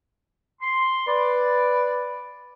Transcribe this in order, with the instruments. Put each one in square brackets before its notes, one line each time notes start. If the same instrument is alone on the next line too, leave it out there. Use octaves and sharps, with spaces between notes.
[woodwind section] C6
[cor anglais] B4 [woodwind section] D5